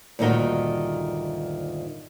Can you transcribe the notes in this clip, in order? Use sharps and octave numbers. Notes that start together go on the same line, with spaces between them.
D2 G2 A#2 D#3 D#4 F#4